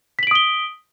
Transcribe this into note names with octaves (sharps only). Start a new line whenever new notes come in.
D#6 B6 D7 F#7 G7